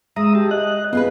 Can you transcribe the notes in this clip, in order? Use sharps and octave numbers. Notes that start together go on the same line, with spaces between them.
G#3 E5 A#5 D#6
G4 A5
D#5 F#6
B3 F4 G#4 B4